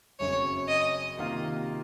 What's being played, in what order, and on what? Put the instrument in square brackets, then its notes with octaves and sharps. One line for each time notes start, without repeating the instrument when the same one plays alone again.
[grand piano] F#1 F#2 C#3 F#3 C4 [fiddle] C#5
[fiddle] D#5
[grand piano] C3 D#3 A#3 F4